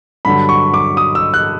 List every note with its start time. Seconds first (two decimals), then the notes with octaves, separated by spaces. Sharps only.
0.25 G2 D3 F#3 B5
0.49 C#6
0.74 D6
0.97 D#6
1.15 E6
1.34 F#6